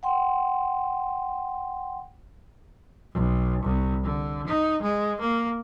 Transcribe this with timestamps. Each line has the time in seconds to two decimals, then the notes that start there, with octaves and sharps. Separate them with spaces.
0.03 F#5 G5 C6
3.13 B1
3.63 C2
4.03 D3
4.47 D#4
4.82 G#3
5.21 A#3